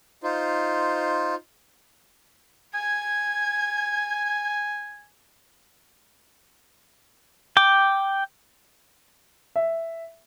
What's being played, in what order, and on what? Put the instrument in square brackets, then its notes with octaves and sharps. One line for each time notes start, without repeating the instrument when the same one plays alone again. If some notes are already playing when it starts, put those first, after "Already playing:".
[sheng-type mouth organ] D#4 F4 C5
[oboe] G#5 [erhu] G#6
[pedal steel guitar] G5 D6
[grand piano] E5